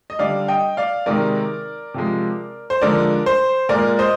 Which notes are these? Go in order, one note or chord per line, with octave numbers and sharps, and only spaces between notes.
D#5
D3 G3 D5 F5
D#5 G5
D5 F5
C3 D#3 G#3 A#4 D5
C3 F3 G#3
C5
D3 F3 G#3 A#4 D5
C5
A#2 G#3 A#4 D5
C5 D#5